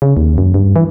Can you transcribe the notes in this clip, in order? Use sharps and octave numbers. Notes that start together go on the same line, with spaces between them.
C#3
D#2
F#2
G2
E3